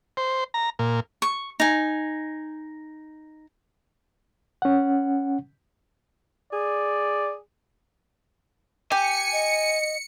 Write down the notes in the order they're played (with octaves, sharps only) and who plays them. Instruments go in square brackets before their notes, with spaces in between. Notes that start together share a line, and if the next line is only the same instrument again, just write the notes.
[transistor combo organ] C5
A#5
A#2
[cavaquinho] C#6
D#4 G#5
[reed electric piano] C#4 F#5
[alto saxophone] G#4 [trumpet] D5
[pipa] G4 [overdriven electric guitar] G#5 [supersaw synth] C#7
[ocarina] D#5